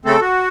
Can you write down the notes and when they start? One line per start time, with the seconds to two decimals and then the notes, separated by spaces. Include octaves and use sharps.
0.05 C#3 A3 C4 A4
0.21 F#4